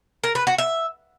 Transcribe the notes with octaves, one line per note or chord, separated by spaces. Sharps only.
A#4
B4
F#4
E5